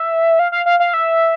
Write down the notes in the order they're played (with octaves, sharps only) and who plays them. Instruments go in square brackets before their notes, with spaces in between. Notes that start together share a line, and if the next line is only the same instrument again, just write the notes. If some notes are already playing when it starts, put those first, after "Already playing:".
Already playing: [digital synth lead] E5
F5
F5
F5
F5
E5